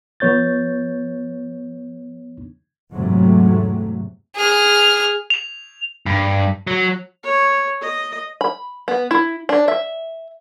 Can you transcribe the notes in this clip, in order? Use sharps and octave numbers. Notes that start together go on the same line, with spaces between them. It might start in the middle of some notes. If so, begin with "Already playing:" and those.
F3 B3 C#5 G6 A6
E2 G#2 C3 F#3 A3
G#4 F6
F7
G2
F#3
C#5
D#5
B5
B3
E4
D4
E5